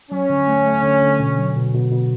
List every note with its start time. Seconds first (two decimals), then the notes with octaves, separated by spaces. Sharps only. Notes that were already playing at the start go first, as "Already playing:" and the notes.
0.11 F#3 C#4
0.30 D3
0.48 A3
0.66 A3
0.83 D3
1.02 D3
1.20 B2
1.38 F#3
1.56 B2
1.74 B2
1.92 B2